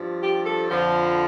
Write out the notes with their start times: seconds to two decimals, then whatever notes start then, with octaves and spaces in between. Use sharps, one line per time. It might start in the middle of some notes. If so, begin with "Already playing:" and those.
Already playing: G2 F3
0.23 G4
0.46 A4
0.69 F2 D3 F3 C5